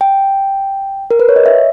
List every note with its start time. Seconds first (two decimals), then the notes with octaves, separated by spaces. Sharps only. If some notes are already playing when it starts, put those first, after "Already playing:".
0.01 G5
1.11 A#4
1.19 B4
1.29 C#5
1.36 D#5
1.46 E5